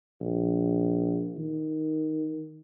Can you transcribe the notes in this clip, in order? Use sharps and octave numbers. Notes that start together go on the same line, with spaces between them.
A#1
D#3